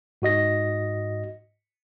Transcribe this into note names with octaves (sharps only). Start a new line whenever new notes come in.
G#2 F#4 D#5 A#6